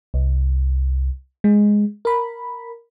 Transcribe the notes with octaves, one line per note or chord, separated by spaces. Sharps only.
C2
G#3
A#4 B5